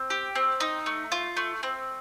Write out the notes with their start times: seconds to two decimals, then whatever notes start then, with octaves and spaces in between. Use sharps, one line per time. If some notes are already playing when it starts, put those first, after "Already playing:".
Already playing: C4
0.10 G4
0.35 C4
0.60 D#4
0.86 A3
1.12 F4
1.37 A3
1.63 C4